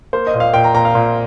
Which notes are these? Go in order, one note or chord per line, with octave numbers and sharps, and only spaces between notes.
A#3 C5
D#5
A#2
F5
A#2 G5
A#5
A#2 A#5
F5
A#2